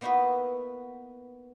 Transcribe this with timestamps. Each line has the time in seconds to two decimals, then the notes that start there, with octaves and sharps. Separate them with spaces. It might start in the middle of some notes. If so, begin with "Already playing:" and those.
0.01 A#3 B3 D#4 E4 F#4 B4